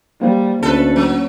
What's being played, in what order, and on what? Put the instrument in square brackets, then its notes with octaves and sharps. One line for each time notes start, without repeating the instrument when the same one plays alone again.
[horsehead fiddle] G3 [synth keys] A#3 C5
[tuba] D2 [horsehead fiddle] C#4 [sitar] A4 B4
[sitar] F#3